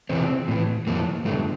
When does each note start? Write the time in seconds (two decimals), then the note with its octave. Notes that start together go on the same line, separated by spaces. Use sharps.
0.09 E2 C3 E3 C4
0.48 A2 E3
0.87 F2 E3 A#3
1.25 G2 A3
1.30 D3